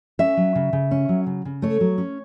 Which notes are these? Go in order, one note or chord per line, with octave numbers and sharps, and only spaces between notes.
C#4 E5
F#3
C#3
C#3
C#4
F#3
C#3
C#3
A3 C#5
F#3
C#4